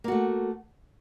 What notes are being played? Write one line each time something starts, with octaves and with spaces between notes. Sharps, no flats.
A3 A#3 F#4